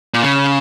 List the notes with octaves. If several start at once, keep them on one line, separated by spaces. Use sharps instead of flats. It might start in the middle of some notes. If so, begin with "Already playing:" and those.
A#2
C#3